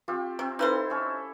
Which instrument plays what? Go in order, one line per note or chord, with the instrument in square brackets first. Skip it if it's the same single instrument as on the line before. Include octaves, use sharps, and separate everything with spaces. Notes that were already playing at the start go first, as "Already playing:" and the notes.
[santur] C4 F4 G4
[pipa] C3 [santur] C4
[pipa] D#4 B4 C5 [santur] E4 A4
[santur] C#4 E5